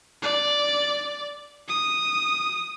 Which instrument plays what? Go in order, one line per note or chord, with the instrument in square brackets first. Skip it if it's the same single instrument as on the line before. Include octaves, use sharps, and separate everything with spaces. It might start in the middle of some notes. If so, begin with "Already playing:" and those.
[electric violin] D5
D#6